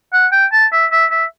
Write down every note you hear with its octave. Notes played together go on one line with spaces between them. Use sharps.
F#5
G5
A5
E5
E5
E5